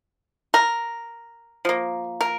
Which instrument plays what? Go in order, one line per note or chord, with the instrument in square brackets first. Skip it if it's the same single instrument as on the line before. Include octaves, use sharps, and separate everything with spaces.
[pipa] A#4
F3 A#3
A#4